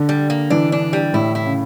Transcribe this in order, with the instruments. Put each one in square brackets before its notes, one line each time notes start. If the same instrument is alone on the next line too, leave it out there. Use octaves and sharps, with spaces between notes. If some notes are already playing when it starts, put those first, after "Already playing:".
Already playing: [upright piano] D3
[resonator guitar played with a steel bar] G3
A#3
[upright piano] E3 [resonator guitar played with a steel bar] D4
[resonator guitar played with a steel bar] D4
G3
[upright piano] A2 [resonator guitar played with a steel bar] E4
[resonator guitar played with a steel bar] E4
[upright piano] C#3